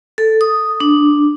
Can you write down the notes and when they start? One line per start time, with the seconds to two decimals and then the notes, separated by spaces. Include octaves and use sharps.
0.18 A4
0.41 D#6
0.80 D4